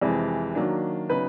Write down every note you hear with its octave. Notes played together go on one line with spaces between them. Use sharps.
F2 C3 E3 G#3
D#3 F#3 A#3 D4
C#3 F#3 B3 D#4 B4